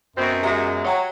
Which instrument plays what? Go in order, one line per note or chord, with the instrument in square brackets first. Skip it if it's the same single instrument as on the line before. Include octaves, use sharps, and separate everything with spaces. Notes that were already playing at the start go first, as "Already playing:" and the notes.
[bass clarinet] F#2 [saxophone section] B2 C4
[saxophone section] B2 F#3 G#3 [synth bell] G4 E5 A#5
[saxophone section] F#3 [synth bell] C#5 G5 A#5